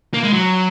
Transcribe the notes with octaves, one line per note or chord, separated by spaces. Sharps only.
A#3
G#3
F#3